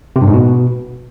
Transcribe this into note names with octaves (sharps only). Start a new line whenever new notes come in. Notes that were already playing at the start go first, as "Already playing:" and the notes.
C3
G2
G#2
B2